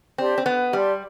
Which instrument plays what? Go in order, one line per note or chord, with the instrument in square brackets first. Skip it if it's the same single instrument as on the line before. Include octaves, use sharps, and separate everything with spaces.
[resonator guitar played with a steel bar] C4 [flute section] G4 D5 A5 C6
[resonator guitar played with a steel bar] C4
B3
[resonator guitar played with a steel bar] G3 [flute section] G4 D5 A5 C6